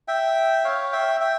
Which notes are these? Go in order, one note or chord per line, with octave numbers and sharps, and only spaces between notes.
E5 G5
C#5 F5
E5 G5
E5 G5